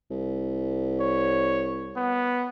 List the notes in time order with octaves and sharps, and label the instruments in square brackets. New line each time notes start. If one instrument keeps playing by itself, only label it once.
[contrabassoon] C2
[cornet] C#5
B3